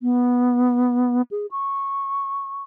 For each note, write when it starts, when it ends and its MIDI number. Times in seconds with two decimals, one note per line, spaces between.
0.01 1.22 59
1.31 1.46 68
1.51 2.63 85